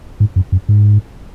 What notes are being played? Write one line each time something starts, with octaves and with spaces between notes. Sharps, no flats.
G#2
F#2
F#2
G#2